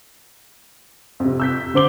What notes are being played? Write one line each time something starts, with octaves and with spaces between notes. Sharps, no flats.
F2 C3
E6 G6 B6
D3 C5 D6 G7